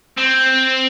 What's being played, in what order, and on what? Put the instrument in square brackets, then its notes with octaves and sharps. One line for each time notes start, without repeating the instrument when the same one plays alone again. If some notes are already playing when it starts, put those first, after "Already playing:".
[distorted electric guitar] C4